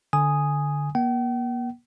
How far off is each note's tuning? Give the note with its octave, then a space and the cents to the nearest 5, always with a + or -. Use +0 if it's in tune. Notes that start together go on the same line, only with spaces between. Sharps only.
D3 +0 G#5 +0 D#6 +0
A#3 +40 G5 -45